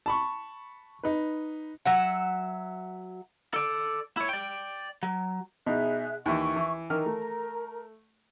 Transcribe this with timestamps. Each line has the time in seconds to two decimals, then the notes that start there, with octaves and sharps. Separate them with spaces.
0.06 A5 B5 C#6
1.03 D#4 B4
1.85 F#3 E5 F#5
3.54 A4 D5
4.17 E4 C#5
4.29 D5 G5
5.03 F#3
5.67 B2 D#4 G#4 E5 F#6
6.26 D#2 E3 E5 C#6
6.56 E3
6.90 D#3 E3 A#4 A#5 F6
7.06 A3